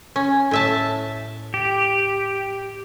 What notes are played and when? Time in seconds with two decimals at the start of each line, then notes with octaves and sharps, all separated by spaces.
0.16 C#4
0.51 A2 E5 A5
1.54 G4